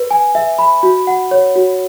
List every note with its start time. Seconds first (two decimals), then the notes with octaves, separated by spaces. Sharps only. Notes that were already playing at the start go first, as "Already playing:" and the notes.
Already playing: B4
0.11 G#5
0.35 E5
0.59 B5
0.83 F#4
1.07 F#5
1.31 C#5
1.56 F#4